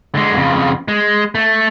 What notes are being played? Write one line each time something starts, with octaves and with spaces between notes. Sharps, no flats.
D3 G#3
F2 C#3
G#3
A3